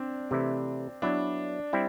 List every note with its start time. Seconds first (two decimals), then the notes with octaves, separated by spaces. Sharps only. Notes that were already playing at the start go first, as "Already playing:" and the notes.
Already playing: C4 D4
0.31 C3 E3 A3 E4
1.02 F#3 B3 D4 E4 B4
1.73 G3 C4 E4